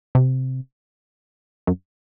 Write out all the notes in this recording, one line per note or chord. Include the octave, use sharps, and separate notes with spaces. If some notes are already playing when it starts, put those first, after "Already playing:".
C3
F#2